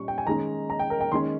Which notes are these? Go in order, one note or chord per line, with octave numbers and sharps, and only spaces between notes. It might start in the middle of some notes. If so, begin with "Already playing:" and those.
Already playing: A#2 G3 C#4 C#6
G5
G#5
D#3 G#3 C#4 A#5
A#5
G5
A#4
G5
D#3 G#3 C#4 C6